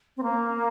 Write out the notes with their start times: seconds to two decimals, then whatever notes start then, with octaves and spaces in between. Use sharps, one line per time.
0.17 C4
0.23 A#3